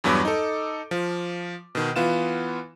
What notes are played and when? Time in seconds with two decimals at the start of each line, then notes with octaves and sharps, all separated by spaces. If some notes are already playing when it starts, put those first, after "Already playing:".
0.04 E2 G2 F#3 B3 B4 D6
0.25 D#4 A4
0.91 F3
1.75 B2 D#3
1.96 E3 B3 F4 E7